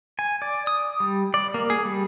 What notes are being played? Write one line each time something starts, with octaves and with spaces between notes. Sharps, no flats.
G#5
D5
D#6
G3
D5
A#3
G#4
G3